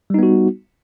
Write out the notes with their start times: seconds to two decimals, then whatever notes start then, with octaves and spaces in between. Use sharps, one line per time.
0.10 G3
0.14 D#4
0.19 B3
0.23 F#4